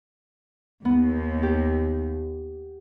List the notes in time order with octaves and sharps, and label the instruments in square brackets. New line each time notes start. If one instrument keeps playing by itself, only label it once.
[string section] D#2 [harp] B3
[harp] G4